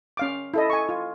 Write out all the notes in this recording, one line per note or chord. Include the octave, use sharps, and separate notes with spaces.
C#4 F5 D6
E4 A4 D#5
G#5 C#6
F4